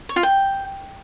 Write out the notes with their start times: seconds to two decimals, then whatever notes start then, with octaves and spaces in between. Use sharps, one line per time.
0.09 C#5
0.16 F4
0.23 G5